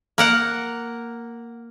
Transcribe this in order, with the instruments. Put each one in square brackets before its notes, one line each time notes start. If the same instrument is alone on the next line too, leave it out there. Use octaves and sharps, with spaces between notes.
[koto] A#3 A#4 F#5